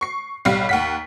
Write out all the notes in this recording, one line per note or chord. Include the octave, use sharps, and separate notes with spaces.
C#6 C7
B1 G3 F5 B5 C7
D#2 F#5 B6